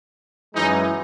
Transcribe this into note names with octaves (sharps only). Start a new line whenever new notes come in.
F#2 E3 G#3 D#4